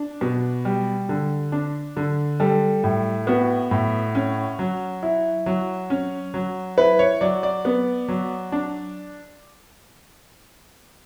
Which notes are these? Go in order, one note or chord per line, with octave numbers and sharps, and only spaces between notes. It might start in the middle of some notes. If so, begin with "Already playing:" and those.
Already playing: D4
B2
G3
D3
D4
D3
G3 A4
A2
B3 F#4
A2
C#4
F#3
E4
F#3
C#4
F#3
E4 B4
C#5
F#3 D5
D5
B3
F#3
D4